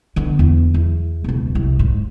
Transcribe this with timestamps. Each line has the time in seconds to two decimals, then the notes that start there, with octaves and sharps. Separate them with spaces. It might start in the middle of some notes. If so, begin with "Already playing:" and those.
0.16 D3 B3
0.39 E2
0.74 E2
1.24 E1 C#2
1.55 C2
1.79 G#2